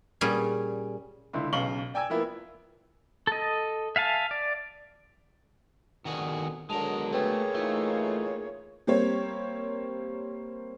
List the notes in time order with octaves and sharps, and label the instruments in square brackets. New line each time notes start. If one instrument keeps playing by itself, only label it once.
[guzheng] A#2 G3 C#4 G#4
[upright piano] C#2 D3 E4 C6
B1 C#3 F5 C#6 F#7 G7
D5 G5 G#5 E6 G#6
F3 A#3 B3 E4
[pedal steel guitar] A4 D#5
E5 F5 G#5 A5
D5
[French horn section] F2 B2 D3 [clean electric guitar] D#3 F#4 G#4
[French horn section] B2 D3 F#3 [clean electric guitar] G#3 A#4 [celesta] A5 F7
[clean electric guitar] A3 [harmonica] A#3 G#4 C#5 [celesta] A4 B4 G5
[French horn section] E3 D#4 F4 [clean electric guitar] A3
[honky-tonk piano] G3 A#3 C4 C#5